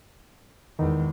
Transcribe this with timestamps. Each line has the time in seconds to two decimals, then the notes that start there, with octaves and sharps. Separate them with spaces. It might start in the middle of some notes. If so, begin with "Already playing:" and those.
0.79 E2 D#3 G#3